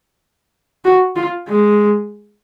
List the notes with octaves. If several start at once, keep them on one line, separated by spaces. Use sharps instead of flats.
F#4
F4
G#3